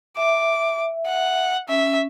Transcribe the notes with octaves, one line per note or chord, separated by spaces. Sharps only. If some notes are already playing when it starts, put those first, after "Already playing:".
E5 D6
F#5
C#4 E5